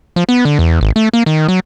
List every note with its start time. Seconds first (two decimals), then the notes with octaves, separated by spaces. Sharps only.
0.16 F3
0.29 B3
0.45 D3
0.59 E2
0.81 G#1
0.96 A3
1.13 A#3
1.26 D#3
1.48 F#3